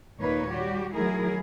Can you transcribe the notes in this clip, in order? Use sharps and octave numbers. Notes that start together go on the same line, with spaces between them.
D#2 A#2 A#3 D#4 B4 C#5
G3 F#4 G4
D#3 F#3 A3 E4 G#4 A#4